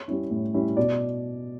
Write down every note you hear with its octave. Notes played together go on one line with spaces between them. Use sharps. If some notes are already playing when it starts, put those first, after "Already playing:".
Already playing: C#5
G3 C#4 E4
A2
G3 C#4 E4
B2 D5